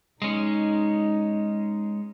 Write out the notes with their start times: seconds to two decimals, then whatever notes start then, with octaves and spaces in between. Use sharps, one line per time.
0.22 G#3 C#4 D#4